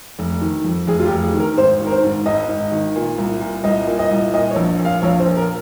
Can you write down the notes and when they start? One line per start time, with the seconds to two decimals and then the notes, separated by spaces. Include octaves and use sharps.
0.19 F1
0.41 D#3
0.64 F2
0.87 F1 G#4
1.00 F4
1.06 G4
1.11 F1
1.23 G#4
1.34 D#3
1.40 A#4
1.57 G#1 C5
1.80 D#3
1.87 A#4
1.92 C5
2.03 G#2
2.26 G#1 D#5
2.48 G#1
2.72 D#3
2.96 A#2
3.18 C2
3.41 A#2
3.64 C2 D#5
3.87 A#2
3.99 D#5
4.11 C2
4.33 A#2 D#5
4.50 C#5
4.56 A#1
4.79 A#2
4.85 F5
5.02 A#1 C#5
5.20 C5
5.26 A#2
5.37 A#4